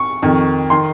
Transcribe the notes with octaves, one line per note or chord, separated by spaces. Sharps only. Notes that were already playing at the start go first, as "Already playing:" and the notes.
Already playing: C#6
F2 D#3
D#3 C6